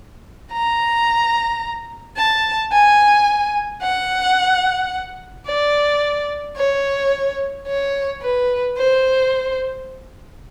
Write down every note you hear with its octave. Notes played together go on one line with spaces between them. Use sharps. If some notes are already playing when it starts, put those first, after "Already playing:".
A#5
A5
G#5
F#5
D5
C#5
C#5
B4
C5